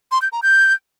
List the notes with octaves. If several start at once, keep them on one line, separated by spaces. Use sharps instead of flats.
C6
G6
A#5
G6